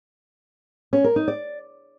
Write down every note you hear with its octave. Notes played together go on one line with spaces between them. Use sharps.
C#4
A#4
D#4
D5